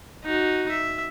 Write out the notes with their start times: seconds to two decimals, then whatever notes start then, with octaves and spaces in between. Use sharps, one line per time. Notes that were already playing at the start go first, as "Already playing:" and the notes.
0.24 D#4 F#4
0.70 E5